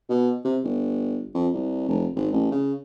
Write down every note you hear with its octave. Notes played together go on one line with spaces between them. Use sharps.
B2
C3
G1
F2
C2
F1
G#1
A1
C#3